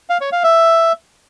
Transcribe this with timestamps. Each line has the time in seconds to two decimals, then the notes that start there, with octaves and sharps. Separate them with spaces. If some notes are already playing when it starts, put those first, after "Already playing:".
0.10 F5
0.21 C#5
0.32 F5
0.44 E5